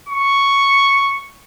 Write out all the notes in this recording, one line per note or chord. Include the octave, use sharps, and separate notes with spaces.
C#6